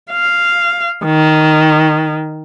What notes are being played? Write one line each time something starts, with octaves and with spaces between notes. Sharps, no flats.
F5
D#3